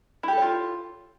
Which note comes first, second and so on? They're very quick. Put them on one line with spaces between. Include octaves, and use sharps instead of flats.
E4 G4 A4 C#5 F4